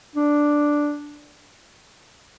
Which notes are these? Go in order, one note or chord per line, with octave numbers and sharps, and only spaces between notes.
D4